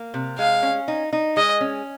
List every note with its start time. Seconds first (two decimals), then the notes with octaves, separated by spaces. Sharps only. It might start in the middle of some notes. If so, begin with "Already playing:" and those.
Already playing: A#3
0.14 C3
0.38 G#3 F5
0.63 C#4
0.88 D#4
1.13 D#4
1.37 G#3 D#5
1.61 C#4